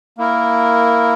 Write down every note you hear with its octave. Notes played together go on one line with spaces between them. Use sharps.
A#3 E4 A#4